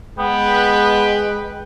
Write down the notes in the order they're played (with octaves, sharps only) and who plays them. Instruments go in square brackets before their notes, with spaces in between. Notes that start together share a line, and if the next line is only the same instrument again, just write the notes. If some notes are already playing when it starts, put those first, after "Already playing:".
[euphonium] G#3 [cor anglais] B3 [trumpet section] B4 G5